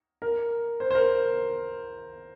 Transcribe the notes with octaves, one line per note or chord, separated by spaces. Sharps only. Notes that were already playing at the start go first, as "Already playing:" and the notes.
A#4
C5
C5
A#4